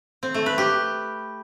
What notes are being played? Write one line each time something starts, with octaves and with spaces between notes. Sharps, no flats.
C4
A3
B4
G4